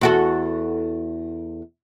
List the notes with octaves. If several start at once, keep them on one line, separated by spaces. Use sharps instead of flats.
E2 F#4 A4